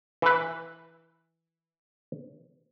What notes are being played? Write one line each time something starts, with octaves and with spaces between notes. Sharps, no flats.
E3 B4